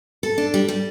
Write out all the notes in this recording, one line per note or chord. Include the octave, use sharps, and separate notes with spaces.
A4
D4
G3
G3